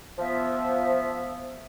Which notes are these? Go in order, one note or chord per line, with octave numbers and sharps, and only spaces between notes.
F3 B3 E5